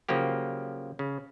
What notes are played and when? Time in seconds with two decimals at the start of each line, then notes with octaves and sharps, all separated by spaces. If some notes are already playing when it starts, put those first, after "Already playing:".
0.09 C#3 F3 F#3 A#3 G4
0.99 C#3